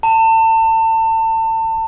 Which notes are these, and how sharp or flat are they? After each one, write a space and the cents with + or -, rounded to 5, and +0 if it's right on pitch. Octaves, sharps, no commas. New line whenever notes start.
A5 +30